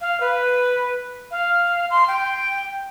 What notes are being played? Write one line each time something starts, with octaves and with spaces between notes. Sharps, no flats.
F5
B4
F5
C6
G5